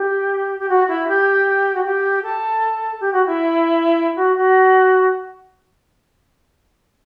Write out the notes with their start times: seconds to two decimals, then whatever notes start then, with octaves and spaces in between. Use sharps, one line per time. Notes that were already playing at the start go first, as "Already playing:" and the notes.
Already playing: G4
0.59 G4
0.69 F#4
0.87 E4
1.07 G4
1.74 F#4
1.84 G4
2.22 A4
3.00 G4
3.13 F#4
3.26 E4
4.15 F#4
4.36 F#4